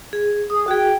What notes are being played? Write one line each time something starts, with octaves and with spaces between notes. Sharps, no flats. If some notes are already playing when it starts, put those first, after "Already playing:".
G#4
G#4 D#6
F#4 G#4 G5